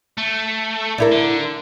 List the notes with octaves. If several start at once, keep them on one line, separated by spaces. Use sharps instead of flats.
A3
D4 E4 A#4
D3